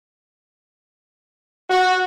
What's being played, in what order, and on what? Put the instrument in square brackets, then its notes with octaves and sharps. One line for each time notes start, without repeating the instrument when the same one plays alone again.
[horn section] F#4